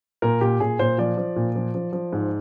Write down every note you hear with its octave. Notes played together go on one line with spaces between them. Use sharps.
A#2 A#4
A#2 G4
A#2 G#4
A#2 C5
F3 D5
F3
A#2
F3
F3
F3
G#2